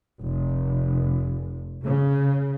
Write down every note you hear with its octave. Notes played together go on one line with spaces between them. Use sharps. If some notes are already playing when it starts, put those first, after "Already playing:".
F1
C#3